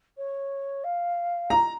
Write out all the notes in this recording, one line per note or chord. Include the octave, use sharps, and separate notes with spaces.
C#5
F5
A#5